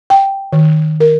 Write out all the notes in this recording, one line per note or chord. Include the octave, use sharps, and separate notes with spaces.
G5
D#3
A#4